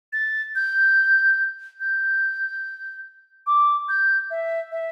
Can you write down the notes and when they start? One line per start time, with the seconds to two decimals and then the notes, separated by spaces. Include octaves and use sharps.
0.13 A6
0.55 G6
1.80 G6
3.47 D6
3.89 G6
4.31 E5
4.71 E5